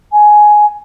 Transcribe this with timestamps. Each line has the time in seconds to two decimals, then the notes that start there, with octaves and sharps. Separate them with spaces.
0.12 G#5